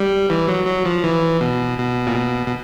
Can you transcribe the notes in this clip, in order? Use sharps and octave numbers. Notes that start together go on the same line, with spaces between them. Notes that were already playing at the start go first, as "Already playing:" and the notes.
Already playing: G3
E3
F#3
F#3
F3
E3
B2
B2
A#2
B2
B2